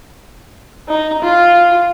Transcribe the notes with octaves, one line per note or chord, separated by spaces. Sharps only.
D#4
F4